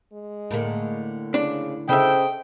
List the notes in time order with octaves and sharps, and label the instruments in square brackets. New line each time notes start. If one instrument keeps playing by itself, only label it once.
[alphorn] G#3
[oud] A2 D3 A#3
[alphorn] C#3 [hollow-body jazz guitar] D4
[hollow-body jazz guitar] C#3 E5 [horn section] A4 D#5 G5 [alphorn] C5